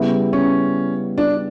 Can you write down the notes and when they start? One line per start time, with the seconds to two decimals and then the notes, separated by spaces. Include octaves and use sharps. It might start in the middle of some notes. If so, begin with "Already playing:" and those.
Already playing: C#3 G3 B3 E4
0.33 C#4
1.18 D4